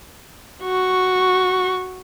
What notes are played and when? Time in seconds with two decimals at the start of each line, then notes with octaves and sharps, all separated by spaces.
0.63 F#4 C#6